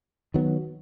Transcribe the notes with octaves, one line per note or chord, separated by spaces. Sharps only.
D#3 F#3 B3